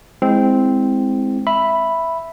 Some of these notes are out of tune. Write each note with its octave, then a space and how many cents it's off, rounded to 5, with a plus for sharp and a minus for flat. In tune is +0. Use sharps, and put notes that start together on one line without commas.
G#3 +0 C4 +0 E4 -5
E5 +0 B5 +0